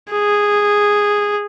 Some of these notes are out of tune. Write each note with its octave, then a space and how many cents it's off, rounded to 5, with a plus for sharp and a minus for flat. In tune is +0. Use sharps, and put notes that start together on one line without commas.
G#4 -10